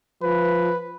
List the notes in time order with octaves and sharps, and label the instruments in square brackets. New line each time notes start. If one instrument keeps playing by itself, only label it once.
[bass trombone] F3 [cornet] B4